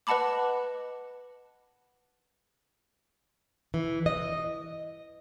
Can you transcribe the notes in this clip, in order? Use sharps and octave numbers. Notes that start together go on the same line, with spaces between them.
B4 D#5 F#5 A5 B5 D6
E3
D#5